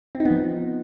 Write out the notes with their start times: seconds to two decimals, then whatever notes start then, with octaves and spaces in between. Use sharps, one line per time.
0.15 C4
0.20 D#4
0.25 B3
0.31 F3